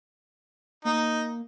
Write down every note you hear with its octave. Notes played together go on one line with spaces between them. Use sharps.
A#3 D#4